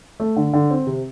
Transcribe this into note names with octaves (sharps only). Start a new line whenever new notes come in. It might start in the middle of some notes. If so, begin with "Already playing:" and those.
A3
D3
D3
C4
C3